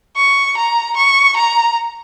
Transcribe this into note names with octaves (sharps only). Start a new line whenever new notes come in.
C#6
A#5
C#6
A#5